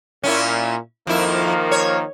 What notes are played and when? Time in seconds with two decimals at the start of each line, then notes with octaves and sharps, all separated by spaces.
0.24 A#2 C#4 E4
1.07 F2 D#3 F3 A#3 E4
1.71 C#5